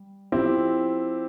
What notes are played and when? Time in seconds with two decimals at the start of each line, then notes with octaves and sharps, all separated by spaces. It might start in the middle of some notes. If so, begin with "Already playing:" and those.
Already playing: G3
0.32 F3 C4 E4 G4